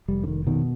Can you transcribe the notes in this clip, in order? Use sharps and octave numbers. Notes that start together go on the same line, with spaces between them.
F1 G3
D3
D#3
B2 D#3